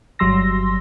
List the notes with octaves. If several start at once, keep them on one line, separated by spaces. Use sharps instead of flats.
G1 F#3 G3 C6 E6 A#6